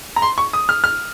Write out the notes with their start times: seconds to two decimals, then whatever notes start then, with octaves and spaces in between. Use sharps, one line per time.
0.16 A#5
0.22 C6
0.38 C#6
0.53 D#6
0.69 F6
0.84 F6